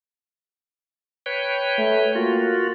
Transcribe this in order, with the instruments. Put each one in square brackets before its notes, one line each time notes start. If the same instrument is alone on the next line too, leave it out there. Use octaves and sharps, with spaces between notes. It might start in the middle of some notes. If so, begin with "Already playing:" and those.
[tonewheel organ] B4 C#5 G5
[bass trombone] A3
[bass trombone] A#3 [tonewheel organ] F4 F#4